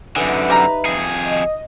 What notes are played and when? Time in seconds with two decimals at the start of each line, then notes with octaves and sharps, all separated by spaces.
0.16 F#2 D3 D#4 G#4 B4 E5
0.50 G3 A#5
0.86 F2 G#4
1.26 D#5